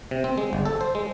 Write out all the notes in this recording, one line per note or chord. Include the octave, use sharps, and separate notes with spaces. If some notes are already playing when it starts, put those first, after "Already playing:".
C3
C4
G#3
G1
A4
C5
G#3